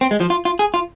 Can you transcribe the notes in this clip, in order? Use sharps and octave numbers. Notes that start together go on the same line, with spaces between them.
C4
G#3
F3
F4
F4
G#4
F4